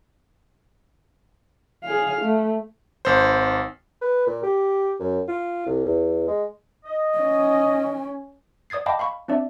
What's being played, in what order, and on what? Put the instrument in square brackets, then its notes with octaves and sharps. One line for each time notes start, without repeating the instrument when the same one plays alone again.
[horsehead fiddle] G#4 F5
A3
[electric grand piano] G#1 C5
[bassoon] B4
A#2
G4
F#2
F4
C2
E2
G#3
[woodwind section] D#5
[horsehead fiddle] C#4
[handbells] D5 D#6 G#6 A6 C7
D#5 F5 G5 A5 B5 D6
F5 B5 C#6
C4 D4 D5 E5